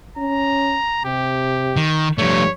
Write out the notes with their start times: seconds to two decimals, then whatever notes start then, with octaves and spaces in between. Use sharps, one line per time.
0.18 C#4 A#5
1.05 C3 G4
1.76 D#3
2.18 G2 F3 A3 C#5